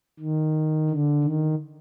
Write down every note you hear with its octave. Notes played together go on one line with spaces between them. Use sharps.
D#3
D3
D#3